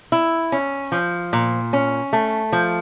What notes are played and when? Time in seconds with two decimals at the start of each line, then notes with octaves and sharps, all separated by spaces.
0.12 E4
0.52 C#4
0.92 F3
1.33 A#2
1.73 C#4
2.13 A3
2.52 F3